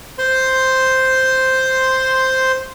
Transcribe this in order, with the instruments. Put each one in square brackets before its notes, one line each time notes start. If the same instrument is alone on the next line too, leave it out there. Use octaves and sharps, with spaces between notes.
[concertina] C5 C6